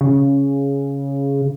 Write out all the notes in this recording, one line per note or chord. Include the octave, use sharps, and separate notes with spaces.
C#3